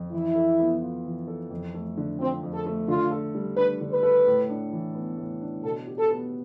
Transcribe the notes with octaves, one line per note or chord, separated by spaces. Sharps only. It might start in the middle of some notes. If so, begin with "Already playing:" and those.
Already playing: F2
E3 E4
A4
B3
F4
E3
A4
F2
A3
D3
F3 C4
F2
A4
A3
D3 F4
A4
G3
D4 B4
D3
B4
A4
A2
D4
E3
B3
A2
D4
B2 A4
G4
A4
B3